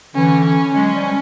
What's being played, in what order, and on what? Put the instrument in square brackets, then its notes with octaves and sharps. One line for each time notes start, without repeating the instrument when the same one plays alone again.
[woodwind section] D3 E3 [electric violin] C#4
[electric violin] C#4
[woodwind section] F#3 G#3 [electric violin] C#4
[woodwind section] F3 G3